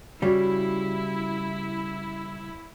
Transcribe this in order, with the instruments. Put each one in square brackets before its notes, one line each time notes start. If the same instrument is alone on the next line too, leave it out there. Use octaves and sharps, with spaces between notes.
[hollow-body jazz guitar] C#3 G3 [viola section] E4 [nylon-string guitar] F#4 C#5 D5